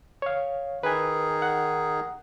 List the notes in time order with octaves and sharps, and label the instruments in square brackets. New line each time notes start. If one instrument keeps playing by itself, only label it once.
[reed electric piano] C#5 F5
[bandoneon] D#3 D#4 G#4 [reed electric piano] B4 G#5
[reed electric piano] F#5